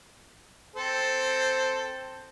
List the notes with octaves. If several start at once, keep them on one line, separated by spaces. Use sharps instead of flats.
C4 A4 C5